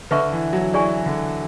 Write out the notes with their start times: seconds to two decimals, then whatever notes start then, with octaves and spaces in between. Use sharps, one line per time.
0.11 D3 B4 E5 A5 C#6
0.32 E3
0.53 F#3
0.74 E3 G#4 D5 G#5 C#6
1.06 D3